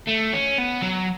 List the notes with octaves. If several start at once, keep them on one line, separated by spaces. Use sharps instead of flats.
A3
C#4
B3
F#3